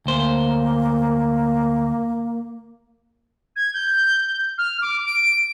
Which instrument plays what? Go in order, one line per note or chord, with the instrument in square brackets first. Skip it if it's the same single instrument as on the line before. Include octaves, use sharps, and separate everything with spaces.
[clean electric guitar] D2 C5 [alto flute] A#3
[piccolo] G#6
G6
F6
D6
D7